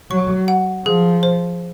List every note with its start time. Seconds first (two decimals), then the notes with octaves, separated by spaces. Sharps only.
0.11 F#3 C#6
0.48 F#5
0.85 F3 G#4
1.23 C5